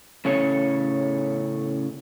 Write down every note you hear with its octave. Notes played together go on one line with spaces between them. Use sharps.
A2 C#3 C#4 A4 C#5